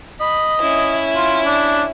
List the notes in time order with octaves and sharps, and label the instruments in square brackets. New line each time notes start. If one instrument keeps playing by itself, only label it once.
[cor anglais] D#5 [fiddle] B5
[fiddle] C#4 E4
[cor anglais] F4
D4